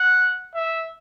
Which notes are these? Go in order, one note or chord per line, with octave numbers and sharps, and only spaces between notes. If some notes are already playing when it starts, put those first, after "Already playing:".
Already playing: F#5
E5